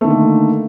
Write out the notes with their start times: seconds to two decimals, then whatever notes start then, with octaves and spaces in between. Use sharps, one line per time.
0.01 A3
0.04 D#3
0.07 D3
0.11 A#3